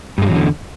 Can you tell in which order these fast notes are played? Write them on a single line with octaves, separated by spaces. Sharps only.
G2 G#3 F#3 E2 D3